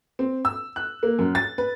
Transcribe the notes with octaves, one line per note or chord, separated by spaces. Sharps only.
C4
E6
F#6
A#3
F#2
A6
B4